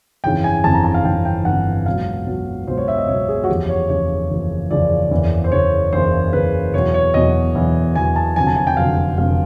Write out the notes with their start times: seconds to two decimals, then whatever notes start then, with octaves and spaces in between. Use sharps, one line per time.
0.23 G1 F2 C#3 E3 G5
0.44 G#5
0.64 G1 F2 C#3 E3 A5
0.74 A#5
0.84 A5
0.94 F5
1.05 G1 F2 C#3 E3 G5
1.25 G5
1.45 G1 F2 C#3 E3 F#5
1.86 C#2 B2 F#3 F5
2.27 C#2 B2 F#3
2.67 C#2 B2 F#3 C5
2.77 C#5
2.88 E5
2.98 D#5
3.08 C#2 B2 F#3 C#5
3.28 G#4
3.44 F#4
3.49 F#1 E2 C#3 F3 G4
3.69 C#5
3.89 F#1 E2 C#3 F3 C#5
4.30 F#1 E2 C#3 F3
4.71 F#1 E2 C#3 F3 D5
5.11 F#1 E2 C#3
5.44 C5
5.52 F#1 E2 C#3 C#5
5.93 F#1 E2 C#3 C5
6.33 F#1 E2 C#3 B4
6.74 E2 B2 F#3 C#5
6.94 C#5
7.14 E2 B2 F#3 D#5
7.55 E2 B2 F#3
7.96 E2 B2 F#3 G#5
8.16 A5
8.36 F1 F2 D3 F#3 G#5
8.47 A5
8.56 G#5
8.67 G5
8.77 F1 F2 D3 F#3 F5
9.18 F1 F2 D3 F#3 F5